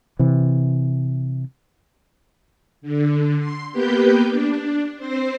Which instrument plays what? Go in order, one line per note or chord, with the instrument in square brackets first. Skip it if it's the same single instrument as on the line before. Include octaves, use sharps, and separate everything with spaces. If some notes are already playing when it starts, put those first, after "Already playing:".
[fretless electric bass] C3 E3
[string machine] D3
C6
A#3 B3 G4 B4 G6
D4
C4 C5